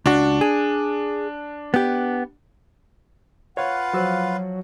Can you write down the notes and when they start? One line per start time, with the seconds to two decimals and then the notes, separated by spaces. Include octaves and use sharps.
0.06 C#2 D4 F#4
0.41 G#4
1.74 B3 G4
3.57 F4 B4 C#5 F5 F#5
3.93 F3 F#3 F#4 E6